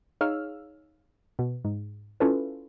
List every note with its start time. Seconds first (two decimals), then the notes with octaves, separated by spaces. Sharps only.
0.21 D#4 G#4 C#5 F5 E6 F6
1.39 B2
1.65 G#2
2.20 C#4 E4 F4 A4 B4